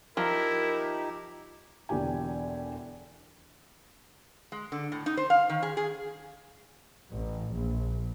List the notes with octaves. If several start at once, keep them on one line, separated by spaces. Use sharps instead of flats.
F3 D#4 E4 G4 A#4
E1 D3 E3 G4 G#5
G#3
D3
A2
D#4
C5
F5
D#3
G#4
G#4
A1
A#1